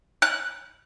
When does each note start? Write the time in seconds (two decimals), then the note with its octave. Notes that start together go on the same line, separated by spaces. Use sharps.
0.22 F#6